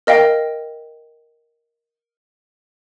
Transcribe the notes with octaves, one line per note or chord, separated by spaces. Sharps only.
A#4 D#5 F5 G5